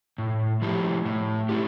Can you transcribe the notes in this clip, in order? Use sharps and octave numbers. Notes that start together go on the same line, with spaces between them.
A2
F3 A3 E4 G4
A2
A3 E4 G4